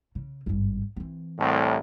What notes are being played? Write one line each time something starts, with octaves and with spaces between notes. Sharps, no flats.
C#3
G#1 G2
E3 C4
C2 A2